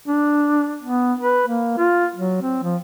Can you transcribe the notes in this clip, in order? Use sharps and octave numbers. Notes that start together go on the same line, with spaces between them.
D4
B3
B4
A#3
F4
F#3
C4
F3